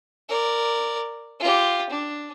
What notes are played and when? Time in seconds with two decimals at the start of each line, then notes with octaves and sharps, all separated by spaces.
0.28 A#4 D5
1.39 F4 G4
1.89 D4